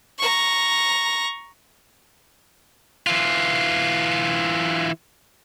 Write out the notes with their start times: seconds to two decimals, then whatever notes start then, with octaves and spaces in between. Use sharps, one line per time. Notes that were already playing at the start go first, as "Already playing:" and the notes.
0.18 A#5 C#6
3.07 E3 F4